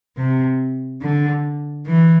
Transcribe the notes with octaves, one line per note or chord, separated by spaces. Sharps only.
C3
D3
E3